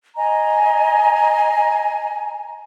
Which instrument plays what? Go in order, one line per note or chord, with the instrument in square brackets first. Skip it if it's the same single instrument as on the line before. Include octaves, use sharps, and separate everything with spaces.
[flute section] D#5 G#5 A#5